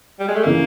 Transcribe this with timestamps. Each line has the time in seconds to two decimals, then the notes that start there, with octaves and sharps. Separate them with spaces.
0.20 G3
0.28 G#3
0.35 A3
0.43 C#3 E3 A#3